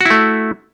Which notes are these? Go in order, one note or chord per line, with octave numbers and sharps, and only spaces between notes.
A3 E4 F#4